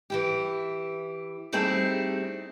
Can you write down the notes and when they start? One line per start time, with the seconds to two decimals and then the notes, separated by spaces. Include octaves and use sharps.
0.10 E3 E4 G4
1.52 G3 A3 C4 D#4 E4 G#4